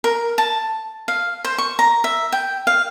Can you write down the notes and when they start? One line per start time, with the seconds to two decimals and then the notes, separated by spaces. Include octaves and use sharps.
0.04 A#4
0.38 A5
1.08 F5
1.45 C5
1.58 C#6
1.79 A#5
2.04 E5
2.32 G5
2.67 F5